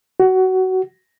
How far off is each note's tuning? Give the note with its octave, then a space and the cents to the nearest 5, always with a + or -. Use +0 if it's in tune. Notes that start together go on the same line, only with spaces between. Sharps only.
F#4 +20